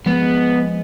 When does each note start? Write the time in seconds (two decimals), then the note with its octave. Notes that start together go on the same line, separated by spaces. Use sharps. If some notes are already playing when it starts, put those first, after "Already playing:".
0.06 F3 G#3 B3